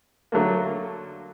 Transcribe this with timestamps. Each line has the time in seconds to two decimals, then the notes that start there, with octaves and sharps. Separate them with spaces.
0.32 D3 F#3 A3 A#3